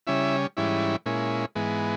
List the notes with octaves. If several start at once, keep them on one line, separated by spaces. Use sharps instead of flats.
C#3 G3 C#4 E4 E5
G#2 E3 G3 C#4 E4
A#2 G#3 C#4 E4
G#2 E3 G#3 B3